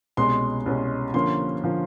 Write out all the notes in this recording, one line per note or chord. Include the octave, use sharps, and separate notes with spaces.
C2 B2 G#3 C#4 C6
C2 B2 G#3 C#4
D3 F3 A#3 C#4 C6
D3 F3 A#3 C#4